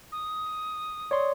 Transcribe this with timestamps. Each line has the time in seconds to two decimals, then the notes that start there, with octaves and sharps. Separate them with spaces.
0.12 D#6
1.11 C#5 D5 C6